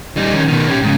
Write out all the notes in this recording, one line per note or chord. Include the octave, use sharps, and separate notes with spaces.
G3 D#4
D#3 C#4
B2 D#3
C#4 G4
G#2 C#3